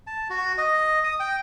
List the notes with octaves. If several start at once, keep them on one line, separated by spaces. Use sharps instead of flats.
A5
F#4
D#5
D#6
G5